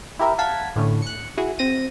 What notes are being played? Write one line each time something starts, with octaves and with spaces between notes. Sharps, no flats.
E4 G4 A#4 E5
F5 F#5 A5 G#6 B6
A2 D3 A3 C#4
F#6 C#7
E4 F#4 G#4
C4 A#6 D#7